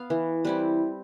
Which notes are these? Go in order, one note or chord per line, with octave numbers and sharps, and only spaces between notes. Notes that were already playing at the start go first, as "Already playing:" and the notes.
Already playing: B3 F5
E3
G3 C4 E4 B4